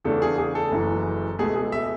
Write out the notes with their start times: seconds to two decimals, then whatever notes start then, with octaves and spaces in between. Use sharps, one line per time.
0.04 E2 C#3 E3 A3 D4 A4
0.22 G#4
0.38 G#4
0.55 A4
0.72 F#1 F#2 E3
1.39 C#2 B2 A3 G#4
1.56 G#4
1.72 E5